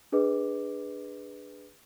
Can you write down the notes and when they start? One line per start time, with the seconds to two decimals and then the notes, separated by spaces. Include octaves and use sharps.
0.12 D4 G#4 B4 D#5 D6